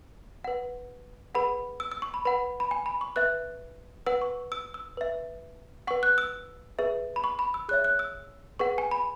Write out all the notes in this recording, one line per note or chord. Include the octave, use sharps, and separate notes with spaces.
B4 F#5
G#4 B4 F#5 B5
E6
E6
C#6
B5
B4 F#5 B5
B5
G#5
B5
C#6
B4 E5 F#6
B4 F#5 E6
C#6
E6
E6
B4 E5
B4 F#5 C#6
F#6
E6
G#4 B4 E5
B5
C#6
B5
E6
G#4 C#5 E5 F#6
F#6
E6
G#4 B4 F#5 C#6
G#5
B5